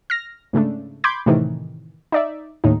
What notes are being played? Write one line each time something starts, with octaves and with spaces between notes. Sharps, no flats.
F6 A#6
G#2 C#3 A3 D4
B5 C6 D6 G6 G#6
A2 C3 D#3 E3
D#4 D5 E5
D#2 A2 D#4